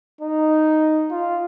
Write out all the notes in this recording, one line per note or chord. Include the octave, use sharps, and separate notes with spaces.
D#4
F4